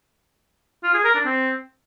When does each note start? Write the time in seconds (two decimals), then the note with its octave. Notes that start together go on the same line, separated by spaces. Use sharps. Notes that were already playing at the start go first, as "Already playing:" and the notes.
0.83 F4
0.94 G#4
1.04 A#4
1.15 D4
1.25 C4